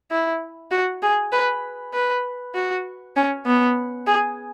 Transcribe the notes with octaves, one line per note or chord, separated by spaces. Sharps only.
E4
F#4
G#4
B4
B4
F#4
C#4
B3
G#4